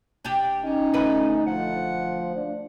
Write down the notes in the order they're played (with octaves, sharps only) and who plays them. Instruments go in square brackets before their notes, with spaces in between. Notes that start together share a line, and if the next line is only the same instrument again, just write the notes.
[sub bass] E1 [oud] D4 G4
[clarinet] C#4 [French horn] D#4
[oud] D2 A3 B4
[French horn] F3 [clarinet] F#5
[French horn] D4